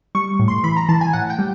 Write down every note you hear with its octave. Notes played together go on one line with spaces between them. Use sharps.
G3 C#6
A2
C6
E3 B5
A#5
E3 A5
G#5
A2 F#5
G5
G3